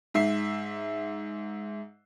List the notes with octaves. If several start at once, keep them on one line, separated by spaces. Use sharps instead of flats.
G#2 E5 C7